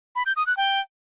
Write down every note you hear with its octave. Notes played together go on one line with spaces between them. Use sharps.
B5
G6
D#6
F#6
G5